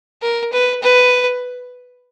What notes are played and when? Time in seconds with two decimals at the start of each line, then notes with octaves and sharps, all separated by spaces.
0.22 A#4
0.53 B4
0.83 B4